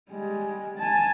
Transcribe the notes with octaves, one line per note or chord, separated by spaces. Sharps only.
G3 G#3
G#5 A5